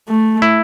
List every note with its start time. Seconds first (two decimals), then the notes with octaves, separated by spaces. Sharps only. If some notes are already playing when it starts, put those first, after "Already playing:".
0.08 A3
0.42 E4